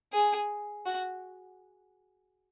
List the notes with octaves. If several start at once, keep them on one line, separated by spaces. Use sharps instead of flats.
G#4
F#4